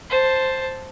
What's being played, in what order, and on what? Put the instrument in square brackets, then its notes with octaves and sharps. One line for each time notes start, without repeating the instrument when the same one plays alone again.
[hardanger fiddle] C5 A5